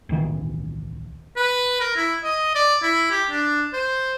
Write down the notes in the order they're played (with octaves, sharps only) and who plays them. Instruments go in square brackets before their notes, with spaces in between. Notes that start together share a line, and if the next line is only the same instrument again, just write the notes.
[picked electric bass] D1 B1 D#3 E3
[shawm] B4
A#4
E4
D#5
D5
E4
G4
D4
C5